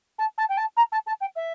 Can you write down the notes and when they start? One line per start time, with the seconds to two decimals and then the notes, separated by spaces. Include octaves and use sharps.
0.19 A5
0.38 A5
0.49 G5
0.57 A5
0.77 A#5
0.92 A5
1.07 A5
1.21 G5
1.36 E5